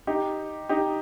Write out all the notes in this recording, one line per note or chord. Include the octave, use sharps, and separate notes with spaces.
D#4 G4
D#4 G4